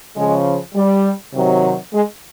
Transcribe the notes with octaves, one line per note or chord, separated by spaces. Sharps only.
C#3 F3 G#3
G3
C3 D#3 F#3
G#3